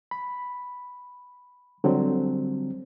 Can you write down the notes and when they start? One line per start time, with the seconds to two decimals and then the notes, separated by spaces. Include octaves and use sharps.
0.11 B5
1.84 D3 F#3 G3 C4